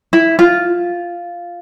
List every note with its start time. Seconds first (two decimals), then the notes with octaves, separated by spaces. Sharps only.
0.13 E4
0.39 F4